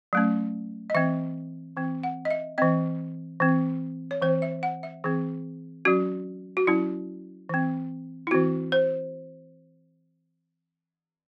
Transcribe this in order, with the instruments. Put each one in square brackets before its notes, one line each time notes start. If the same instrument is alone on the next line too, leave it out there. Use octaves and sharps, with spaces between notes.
[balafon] F#3 A3 C#4
D#5
E3 C4 E5
E3 C4
F#5
D#5
E5
E3 C4 D#5
E3 C4
C#5
E3 C4 C5
E5
F#5
E5
E3 C4 G#4
F#3 C#4 F#4
F#4
F#3 C#4 E4
E3 C4
E4
E3 C4 F#4
C5